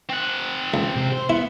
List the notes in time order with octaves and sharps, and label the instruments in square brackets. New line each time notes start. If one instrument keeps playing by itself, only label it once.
[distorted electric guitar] C4 F#5
[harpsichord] C#2
[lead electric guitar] C3
C5
[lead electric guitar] B3 [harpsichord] E4